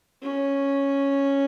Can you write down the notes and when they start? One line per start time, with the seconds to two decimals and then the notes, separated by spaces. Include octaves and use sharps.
0.23 C#4